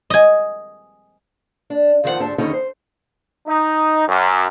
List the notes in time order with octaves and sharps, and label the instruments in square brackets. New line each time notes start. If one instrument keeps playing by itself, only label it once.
[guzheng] D#5 G#5
[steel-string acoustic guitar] D4
D#2 D#3 F3 C4 F4 F#5
D2 G#2 C4 D4 G4 A5
E2 D3 D#3 C#4 D#4 G4
C5
[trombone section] D#4
F#2